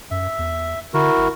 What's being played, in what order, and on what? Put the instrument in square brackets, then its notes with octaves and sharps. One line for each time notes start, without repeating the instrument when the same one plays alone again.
[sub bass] F#2 [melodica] E5
[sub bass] E2
[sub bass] D3 [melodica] E4 F#4 A#4
[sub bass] G#1